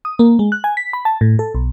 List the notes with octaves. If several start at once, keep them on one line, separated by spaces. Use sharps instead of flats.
D#6
A#3
G#3
F#6
G#5
B6
B5
A5
A2
A4
B1